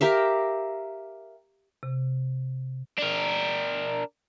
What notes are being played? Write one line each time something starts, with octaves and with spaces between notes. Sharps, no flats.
G4 A#4 E5 F5
C3
D4 A#4